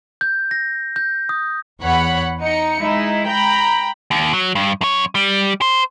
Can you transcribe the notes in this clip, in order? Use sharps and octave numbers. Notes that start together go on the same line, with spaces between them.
G6
A#6
G6
D#6
E2 C#5 F#5 B5
D#4 C#7
G#3 D#4 E4
G5 A#5 B5
D#2
F#3
G2
F#2 C#5
G3
C5